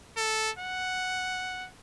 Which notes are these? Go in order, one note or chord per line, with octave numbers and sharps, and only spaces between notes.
A4
F#5